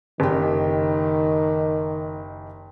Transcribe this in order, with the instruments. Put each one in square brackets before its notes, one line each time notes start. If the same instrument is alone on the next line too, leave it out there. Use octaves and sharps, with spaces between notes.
[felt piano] F#1 G4 [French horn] D#3